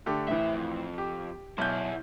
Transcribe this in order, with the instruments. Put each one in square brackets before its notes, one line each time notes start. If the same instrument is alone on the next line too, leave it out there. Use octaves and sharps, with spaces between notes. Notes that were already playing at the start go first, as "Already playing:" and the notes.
[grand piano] D3 A3 G4
[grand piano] A2 E3 [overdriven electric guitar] C5 E5
[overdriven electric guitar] F2
[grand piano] G4
[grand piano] B1 G6 [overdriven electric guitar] E4 G#4